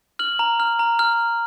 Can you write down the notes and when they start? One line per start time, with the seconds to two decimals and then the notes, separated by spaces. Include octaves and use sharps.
0.19 F6 F#7
0.39 A#5
0.60 F6
0.79 A#5
0.99 F6